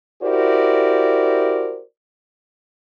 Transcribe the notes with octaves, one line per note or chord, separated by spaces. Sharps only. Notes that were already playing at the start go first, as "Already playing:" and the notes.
E4 F#4 G4 A#4 C5 D5